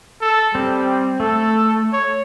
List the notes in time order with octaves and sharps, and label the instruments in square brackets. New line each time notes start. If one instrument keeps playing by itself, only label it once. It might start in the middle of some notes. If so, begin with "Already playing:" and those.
[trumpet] A4
[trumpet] G3 [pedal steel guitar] C4
[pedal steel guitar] A3 [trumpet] A4
[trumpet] C#5